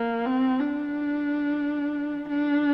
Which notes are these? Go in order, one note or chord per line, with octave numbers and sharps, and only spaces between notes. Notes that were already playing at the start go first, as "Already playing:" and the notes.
Already playing: A#3
C4
D4
D4